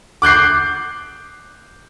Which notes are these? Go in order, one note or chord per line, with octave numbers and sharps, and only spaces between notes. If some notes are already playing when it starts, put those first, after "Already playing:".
D6 F#6 G6 C7